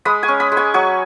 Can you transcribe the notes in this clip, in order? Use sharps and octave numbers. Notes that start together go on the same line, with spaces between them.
G#3 B5 D#6
G#5 C#6
C#4
B5 D#6
G#3
G#5 C#6
F#3 G#5 C#6